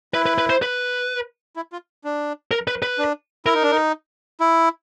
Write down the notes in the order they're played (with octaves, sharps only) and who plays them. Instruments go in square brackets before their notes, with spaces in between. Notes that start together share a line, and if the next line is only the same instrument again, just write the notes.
[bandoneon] E4 [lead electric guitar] B4
[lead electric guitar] B4
B4
C5
B4
[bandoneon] E4
F4
D4
[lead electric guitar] A#4
B4
B4
[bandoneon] D4
[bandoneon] E4 [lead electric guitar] A#4
[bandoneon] D#4
D4
D#4
E4